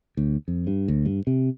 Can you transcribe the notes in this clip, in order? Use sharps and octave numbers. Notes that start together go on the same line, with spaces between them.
D2
F2
G2
D2
G2
C3